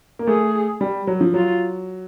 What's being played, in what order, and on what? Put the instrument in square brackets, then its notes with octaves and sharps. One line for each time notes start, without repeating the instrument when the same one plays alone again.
[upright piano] A#3
[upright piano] A3 [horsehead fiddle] G#4
[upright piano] G3
F#3
F3
[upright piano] F#3 [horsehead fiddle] F4